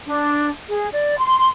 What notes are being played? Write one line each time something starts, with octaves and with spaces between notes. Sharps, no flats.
D4
G#4
D5
C6